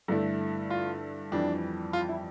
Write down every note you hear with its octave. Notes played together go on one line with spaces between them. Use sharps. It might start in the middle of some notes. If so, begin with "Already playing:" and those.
G2 D3 A3 E4 A4
F4
F2 E3 G3 D4
F4
E4